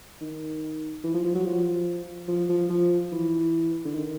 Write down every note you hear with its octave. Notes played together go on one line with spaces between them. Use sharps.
D#3
E3
F3
F3
F#3
F3
F3
F3
F3
E3
D3
D#3